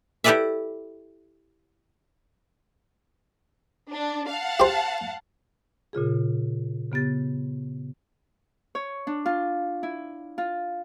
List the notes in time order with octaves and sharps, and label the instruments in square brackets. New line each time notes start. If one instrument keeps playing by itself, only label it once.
[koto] E4 G4 A4 B4 D5 E5
[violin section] D4
F5 F#5 A5
[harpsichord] G4 C5
[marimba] A#2 C#3 F4 G#4
C#3 B3 G4 A6
[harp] C#5
D4
F4
E4
F4